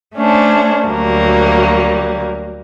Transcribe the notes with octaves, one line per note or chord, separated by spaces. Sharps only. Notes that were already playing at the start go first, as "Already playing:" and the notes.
A3 C#4 D4 C5
D2 F#3 G3 A#3